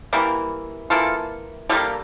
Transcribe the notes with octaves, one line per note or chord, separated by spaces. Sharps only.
E3 G3 A#3
E3 A#3 F4 A4
D3 G3 A#3 F4 A4